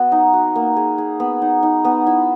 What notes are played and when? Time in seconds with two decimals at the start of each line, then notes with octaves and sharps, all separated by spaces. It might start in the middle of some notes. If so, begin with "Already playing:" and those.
Already playing: B3 F#4
0.12 D#4
0.34 F#4
0.56 A#3
0.76 G#4
0.98 G#4
1.20 B3
1.42 D#4
1.63 D#4
1.85 B3
2.07 E4